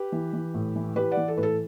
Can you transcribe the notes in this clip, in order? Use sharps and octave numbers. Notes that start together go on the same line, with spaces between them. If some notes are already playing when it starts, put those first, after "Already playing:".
Already playing: G4 B4
E3
E3
A2
E3
E3 G4 B4
D5 F#5
E3
A4
A2 B4
A4